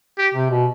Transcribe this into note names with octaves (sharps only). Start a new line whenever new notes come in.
G4
C3
B2